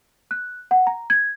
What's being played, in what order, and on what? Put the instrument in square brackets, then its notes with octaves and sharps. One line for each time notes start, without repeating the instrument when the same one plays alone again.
[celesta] F#6
F#5
A#5
G#6